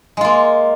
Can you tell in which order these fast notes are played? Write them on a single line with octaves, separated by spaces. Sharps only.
G#3 F4 A#3